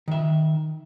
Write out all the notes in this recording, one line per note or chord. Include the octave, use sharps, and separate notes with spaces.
D#3 E5